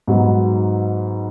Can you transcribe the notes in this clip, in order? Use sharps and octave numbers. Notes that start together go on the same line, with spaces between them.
G#2 F#3 B3 D#4